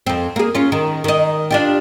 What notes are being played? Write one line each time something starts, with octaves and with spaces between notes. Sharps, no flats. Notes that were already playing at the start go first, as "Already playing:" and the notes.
F2 C4
A#3 G#4
C#4 F4
D#3
D#3 D#5
D4 F4 G4